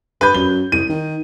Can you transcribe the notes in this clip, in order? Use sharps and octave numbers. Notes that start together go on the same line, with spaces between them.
G2 B4 G6
F#2 G7
C2 D#7
D#3